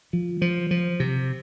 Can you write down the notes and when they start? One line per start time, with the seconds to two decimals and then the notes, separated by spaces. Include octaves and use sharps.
0.13 F3
0.42 F3
0.71 F3
1.00 C3